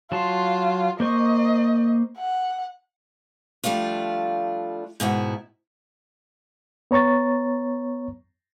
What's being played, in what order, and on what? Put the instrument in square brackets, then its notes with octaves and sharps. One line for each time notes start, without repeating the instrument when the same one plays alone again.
[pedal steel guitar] F#3 A5 C6 [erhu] F4
[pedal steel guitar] A#3 C5 C#6 [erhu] D#5
[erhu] F#5
[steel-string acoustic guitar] F3 G3 A3 D4 F4
G#2 B2 D#3 E4
[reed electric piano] B3 C#5 A#5 C#6 A6